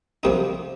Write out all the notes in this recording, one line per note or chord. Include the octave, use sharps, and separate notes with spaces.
F2 C3 G3 A#3 D#4